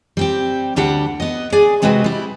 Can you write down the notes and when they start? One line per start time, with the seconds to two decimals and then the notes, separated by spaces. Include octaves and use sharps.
0.17 G3 C4 G4
0.76 D2 G3 D4 F#4 G4 F#5
1.20 B3 D#5
1.52 G#4 D5 G#5
1.82 C3 G#3 C4 F#4 B4
2.04 G3 E4